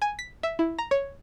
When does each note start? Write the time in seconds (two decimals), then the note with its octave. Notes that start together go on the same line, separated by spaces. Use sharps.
0.02 G#5
0.19 B6
0.43 E5
0.59 E4
0.78 A#5
0.91 C#5